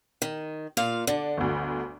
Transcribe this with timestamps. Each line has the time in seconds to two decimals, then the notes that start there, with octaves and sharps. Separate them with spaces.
0.22 D#3
0.77 A#2 F4 F5
1.07 D3 D4
1.37 G1 D2